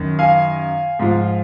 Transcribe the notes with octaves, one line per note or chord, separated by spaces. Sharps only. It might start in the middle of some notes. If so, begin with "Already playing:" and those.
Already playing: F#2 D#3
F5 G#5
G#2 F3